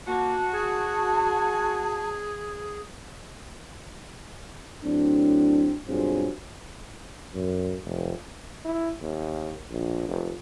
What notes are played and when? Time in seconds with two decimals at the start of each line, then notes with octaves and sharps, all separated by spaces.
0.07 A#3 F#4 A5
0.53 G#4
4.85 A2 F#3 C4 D4
5.88 B1 G2 F#3 C4 F4 G#4
7.34 F#2
7.84 F1
8.65 E4
9.01 D#2
9.70 A#1
10.08 F1